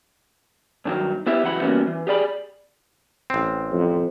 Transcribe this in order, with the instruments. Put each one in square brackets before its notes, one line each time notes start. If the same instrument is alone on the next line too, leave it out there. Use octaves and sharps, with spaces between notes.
[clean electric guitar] G2 D#3 F#3
B3 E4 G4 E5
C#2 E3 F#3 F#5 B5
E3 G3 A#3 B3 C#4 F#4
E3
G4 G#4 D5 B5
[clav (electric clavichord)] A1 C4
[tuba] F2